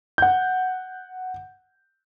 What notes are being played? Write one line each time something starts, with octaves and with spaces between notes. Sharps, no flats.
F#5 G6